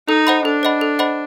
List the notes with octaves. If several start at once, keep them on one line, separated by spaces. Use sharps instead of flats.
D#4 A4
C5 D#5 F#5 B5
D4 A4
C5 D#5 F#5 B5
A4
C5 D#5 F#5 B5